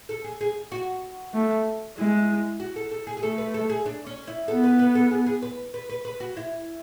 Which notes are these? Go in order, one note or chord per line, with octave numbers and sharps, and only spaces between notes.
A4
G#4
G#4
F#4
A3
G#3 E4
F#4
A4
A4
G#4
G#4
A3 A4
B4
A4
G#4
D4
C#4
E4
B3 A4
B4
B4
A4
G#4
G#4
B4
B4
B4
B4
F#4
E4